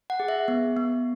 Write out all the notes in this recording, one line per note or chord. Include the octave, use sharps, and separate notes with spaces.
F#5
G#4
E5
B3
B3